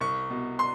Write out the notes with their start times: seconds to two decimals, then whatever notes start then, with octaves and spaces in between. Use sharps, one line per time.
0.01 C2 C#6
0.30 B2
0.59 C6